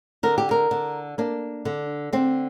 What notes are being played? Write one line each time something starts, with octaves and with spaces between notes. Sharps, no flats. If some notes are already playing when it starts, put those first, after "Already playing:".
D3 A#4
G4
A#4
D3
A#3 D4
D3
D3 C4